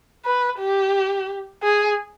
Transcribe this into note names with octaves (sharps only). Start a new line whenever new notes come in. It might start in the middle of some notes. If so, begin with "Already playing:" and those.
B4
G4
G#4